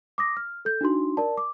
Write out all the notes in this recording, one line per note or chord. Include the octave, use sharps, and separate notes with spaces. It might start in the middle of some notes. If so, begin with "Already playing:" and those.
D6 D#6 A#6
F6
A4 G6
D4 D#4 F#4 C6
A#4 D5 A5
D6